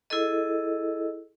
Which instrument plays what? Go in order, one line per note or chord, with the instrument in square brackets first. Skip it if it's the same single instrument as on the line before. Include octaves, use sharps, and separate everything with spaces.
[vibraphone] E4 G#4 A4 D#5